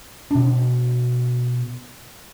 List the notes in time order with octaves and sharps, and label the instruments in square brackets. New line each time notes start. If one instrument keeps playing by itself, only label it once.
[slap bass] B2 D4